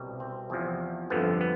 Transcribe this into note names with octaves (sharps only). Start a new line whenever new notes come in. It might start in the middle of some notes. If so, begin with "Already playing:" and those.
Already playing: C2 B2 G3
C4
E2 C3 F3
G1 F2 D3 F3 B3
B3